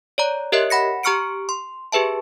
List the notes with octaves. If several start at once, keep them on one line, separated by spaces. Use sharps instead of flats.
C#5 D5 A#5
G4 A#4 C#5 D#5 E5 F#6
F#5 B5 A#6 C#7
G4 A#5 C#6 F6 C#7 D7
C6
G4 G#4 B4 E5 A5